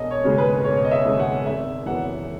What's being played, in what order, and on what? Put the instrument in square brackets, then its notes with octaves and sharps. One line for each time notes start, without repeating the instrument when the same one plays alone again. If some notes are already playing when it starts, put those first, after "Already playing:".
Already playing: [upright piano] E1 D#5
C#5
D#2 C#3 G#3 C#4
B4
E1 C#5
C#5
D#5
E5
D#2 C#3 G#3 C#4
F#5
G#1 E5
F#2 E3 B3 F#5